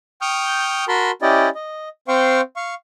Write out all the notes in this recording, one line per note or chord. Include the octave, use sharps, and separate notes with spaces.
G5 C#6 D#6 F6 G6
F#4 A#4 A5 B5 C6
C#4 E4 G4 D5 D#5
D#5
C4 C5 F5 G5 C#6
F5 C#6